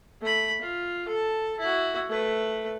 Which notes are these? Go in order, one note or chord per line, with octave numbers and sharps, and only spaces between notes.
A3 B5
F4
A4 A5
E4 F#4
A3 B4